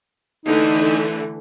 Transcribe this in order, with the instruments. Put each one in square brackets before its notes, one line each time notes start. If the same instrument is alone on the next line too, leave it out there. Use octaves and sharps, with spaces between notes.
[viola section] D3 E3 A3 [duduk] D#4